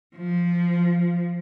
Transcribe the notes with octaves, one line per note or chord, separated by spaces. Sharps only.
F3